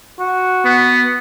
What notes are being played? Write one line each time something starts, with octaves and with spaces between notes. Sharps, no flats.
F#4
B3